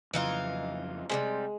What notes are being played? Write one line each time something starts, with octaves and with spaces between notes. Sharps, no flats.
F2 C#3 E3 F#3 D#4 F4
C3 D#3 G3 G#3